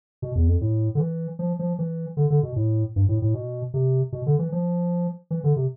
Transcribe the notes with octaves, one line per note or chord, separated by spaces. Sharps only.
B2
E2
F2
A2
D3
E3
F3
F3
E3
D3
D3
B2
A2
G2
A2
A2
B2
C3
B2
D3
E3
F3
E3
D3
C3